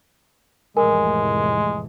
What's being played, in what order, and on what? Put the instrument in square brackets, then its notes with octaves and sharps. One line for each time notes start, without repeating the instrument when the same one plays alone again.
[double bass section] F1 A2 E3 [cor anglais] G#3 [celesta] A#4 G#5